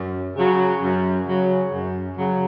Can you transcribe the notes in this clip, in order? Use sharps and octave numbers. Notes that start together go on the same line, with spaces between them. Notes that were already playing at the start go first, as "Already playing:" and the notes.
Already playing: F#2
C#3 F#3
F#2
C#3 F#3
F#2
C#3 F#3